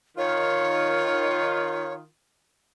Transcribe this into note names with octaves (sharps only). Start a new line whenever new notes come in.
D#3 F4 C#5